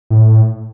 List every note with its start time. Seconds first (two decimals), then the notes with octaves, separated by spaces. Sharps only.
0.10 A2